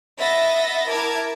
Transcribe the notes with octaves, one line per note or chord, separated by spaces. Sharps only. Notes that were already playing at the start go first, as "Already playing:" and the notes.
D#5 E5 F#5 B5 A6 A#6
E4 A#4 A5 D6 G#6